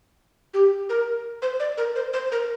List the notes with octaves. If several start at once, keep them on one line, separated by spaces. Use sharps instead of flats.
G4
A#4
C5
D5
A#4
C5
C5
A#4